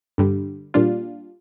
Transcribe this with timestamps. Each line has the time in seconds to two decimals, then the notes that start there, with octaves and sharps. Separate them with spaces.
0.18 G2 D3 G3
0.74 A#2 G3 D4 F4